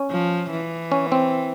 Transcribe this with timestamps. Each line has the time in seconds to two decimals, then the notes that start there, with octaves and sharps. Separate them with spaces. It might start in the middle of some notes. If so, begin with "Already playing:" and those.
Already playing: C#4
0.11 F3
0.51 E3
0.92 C#4
1.12 C4